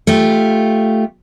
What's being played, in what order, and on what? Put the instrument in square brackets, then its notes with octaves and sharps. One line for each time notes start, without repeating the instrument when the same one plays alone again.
[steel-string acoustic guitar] A3 F4 G4